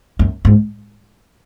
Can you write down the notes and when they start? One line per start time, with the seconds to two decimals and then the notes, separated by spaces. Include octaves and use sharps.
0.19 F#2
0.45 G#2